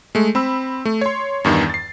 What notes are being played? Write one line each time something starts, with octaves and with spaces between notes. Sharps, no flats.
G#3 A3
C4 B5 E6
A3
C#5 C6
E2 G2 D#3
A6 C7